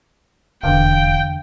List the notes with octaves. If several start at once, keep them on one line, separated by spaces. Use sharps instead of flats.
D#1 E2 D3 F5 G5